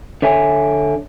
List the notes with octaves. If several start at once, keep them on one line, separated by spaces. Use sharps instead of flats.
D3 C#5 E5 G#5